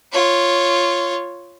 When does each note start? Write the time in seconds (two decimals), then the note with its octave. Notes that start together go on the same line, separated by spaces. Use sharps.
0.12 F4 C#5